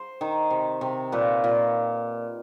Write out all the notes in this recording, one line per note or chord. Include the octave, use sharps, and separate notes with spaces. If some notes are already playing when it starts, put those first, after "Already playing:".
Already playing: C5
D#3
C3
C3
A#2 B4
A#2